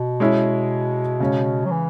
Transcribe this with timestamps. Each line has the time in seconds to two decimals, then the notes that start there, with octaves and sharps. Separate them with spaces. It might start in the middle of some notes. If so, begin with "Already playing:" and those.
Already playing: B2
0.20 G#3 C#4 E4
1.20 C#3 G#3 C#4
1.65 F#3
1.70 E3